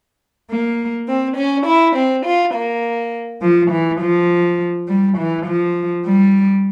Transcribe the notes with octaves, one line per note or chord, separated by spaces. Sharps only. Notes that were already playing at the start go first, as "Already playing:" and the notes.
A#3
C4
C#4
E4
C4
F4
A#3
F3
E3
F3
G3
E3
F3
G3